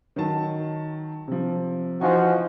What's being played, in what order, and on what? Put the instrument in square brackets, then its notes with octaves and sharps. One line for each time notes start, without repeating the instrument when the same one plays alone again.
[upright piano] D#3 F#3 A5
C3 F3
[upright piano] E3 D#4 G#5 [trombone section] F3 F#4